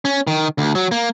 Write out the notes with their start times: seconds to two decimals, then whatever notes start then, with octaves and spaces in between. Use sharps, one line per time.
0.05 C#4
0.27 D#3
0.58 D2
0.75 F#3
0.91 A#3